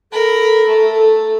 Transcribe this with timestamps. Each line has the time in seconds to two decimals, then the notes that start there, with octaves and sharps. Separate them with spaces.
0.12 A4 A#4 B5
0.68 A3